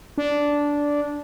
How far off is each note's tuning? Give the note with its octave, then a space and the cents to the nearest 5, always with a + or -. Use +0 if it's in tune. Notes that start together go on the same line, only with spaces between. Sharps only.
D4 -10